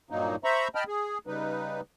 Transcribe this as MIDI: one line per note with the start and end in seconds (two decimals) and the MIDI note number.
0.10 0.36 43
0.10 0.36 46
0.10 0.36 54
0.10 0.36 58
0.10 0.36 63
0.44 0.68 72
0.44 0.68 76
0.44 0.68 82
0.44 0.68 83
0.44 0.68 85
0.75 0.84 75
0.75 0.84 79
0.75 0.84 81
0.75 0.84 83
0.75 0.84 89
0.88 1.18 68
1.27 1.81 49
1.27 1.81 55
1.27 1.81 63
1.27 1.81 71